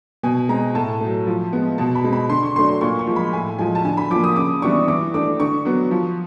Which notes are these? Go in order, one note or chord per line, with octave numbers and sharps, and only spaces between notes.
B2 G#5
G#3 C4 A#5
A2 A5
F#3 A3
F3
G#3 B3
B2 A5
B5
G#3 C4
B5
D3 C6
C#6
F#3 A3 D4 C6
C6
A#2 C#6
C#6
F3 G#3
B5
A2 G#5
F3 G#3 G#5
A5
D3 G#5
B5
F3 A#3 D6
D#6
C#3 D6
E3 G3 B3 D4 C#6
E3 D6
A3 D4 D6
D3 C#6
F#3 B3
F3